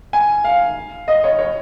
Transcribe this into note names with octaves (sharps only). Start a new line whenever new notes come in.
G#5
F5
D#5
C#5
C#5